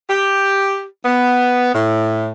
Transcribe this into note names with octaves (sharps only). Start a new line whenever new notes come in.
G4
B3
A2